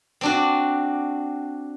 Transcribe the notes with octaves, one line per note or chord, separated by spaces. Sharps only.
C4 D4 F#4